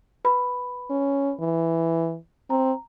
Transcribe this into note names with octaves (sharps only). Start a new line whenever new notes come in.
B4 B5
C#4
E3
C4 A#5